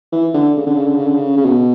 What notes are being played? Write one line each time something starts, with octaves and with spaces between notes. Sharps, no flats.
E3
D3
C#3
D3
C#3
D3
C#3
D3
C#3
C#3
B2